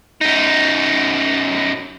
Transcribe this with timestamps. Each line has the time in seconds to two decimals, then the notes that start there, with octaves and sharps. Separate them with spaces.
0.21 F#2 D#4